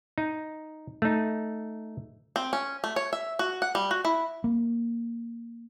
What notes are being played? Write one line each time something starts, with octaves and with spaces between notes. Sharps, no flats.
D#4
A3 D#4
C4
C#4
A3
C#5
E5
F#4
F#5
G3
F#4
E4
A#3